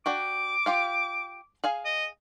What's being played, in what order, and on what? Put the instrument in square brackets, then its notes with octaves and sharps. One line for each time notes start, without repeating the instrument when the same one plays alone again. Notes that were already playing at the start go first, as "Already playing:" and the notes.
[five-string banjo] D4 F#4 G4 [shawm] D6
[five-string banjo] F4 G4 F5
G#4 F5 G#5
[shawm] D#5